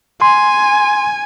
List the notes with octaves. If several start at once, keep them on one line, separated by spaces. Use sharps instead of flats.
G#5 C6